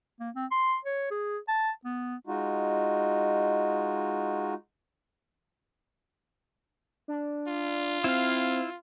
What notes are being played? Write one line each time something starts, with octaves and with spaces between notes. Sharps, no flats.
A#3
C4
C6
C#5
G#4
A5
B3
G#3 D#4 F4 F#4
D4
F4
C4 E4 F5